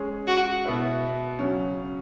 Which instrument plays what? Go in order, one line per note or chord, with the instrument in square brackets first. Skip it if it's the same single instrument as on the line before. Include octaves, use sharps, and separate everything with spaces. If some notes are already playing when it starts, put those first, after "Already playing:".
Already playing: [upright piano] G#3 C#4 G#4
[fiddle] F#4
[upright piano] B2 B3 E4 B4 E5
C#3 F#3 C#4